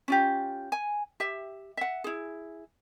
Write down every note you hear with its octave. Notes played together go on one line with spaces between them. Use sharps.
C#4 F4 G4
G#5
G4 E5
E5 F#5
E4 G#4